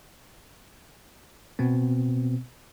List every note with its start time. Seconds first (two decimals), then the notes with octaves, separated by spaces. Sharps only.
1.59 B2 B3 C4